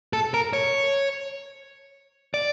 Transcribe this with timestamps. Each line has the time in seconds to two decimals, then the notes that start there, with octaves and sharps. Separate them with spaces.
0.13 A4
0.34 A#4
0.53 C#5
2.34 D5